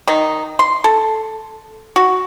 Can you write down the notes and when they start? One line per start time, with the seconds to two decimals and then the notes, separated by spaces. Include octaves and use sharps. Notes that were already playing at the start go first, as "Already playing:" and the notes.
0.08 D#3 D#4
0.59 C6
0.84 A4
1.96 F#4